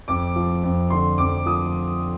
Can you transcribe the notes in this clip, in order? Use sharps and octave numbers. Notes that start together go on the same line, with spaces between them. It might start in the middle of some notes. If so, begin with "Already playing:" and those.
F2 D6
F3
F2
D3 C6
F2 D6
F3 D#6